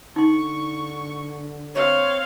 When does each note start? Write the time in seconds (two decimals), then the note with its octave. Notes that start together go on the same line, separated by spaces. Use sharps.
0.16 D3 D#4 C6 C#6
1.75 C4 C#5 F5